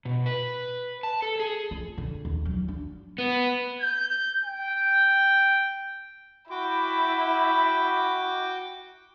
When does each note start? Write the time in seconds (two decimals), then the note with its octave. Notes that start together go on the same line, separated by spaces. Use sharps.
0.05 B2
0.26 B4
1.03 A5
1.22 A4
1.40 G#4
1.71 F4
1.98 D3
2.25 D#2
2.45 F#3
2.68 D4
3.18 B3
3.81 G6
4.44 G5
6.51 E4 F#4 G5 B5 D6